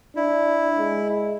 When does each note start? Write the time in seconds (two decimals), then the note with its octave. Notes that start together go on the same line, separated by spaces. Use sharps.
0.16 D4 E4
0.78 G#3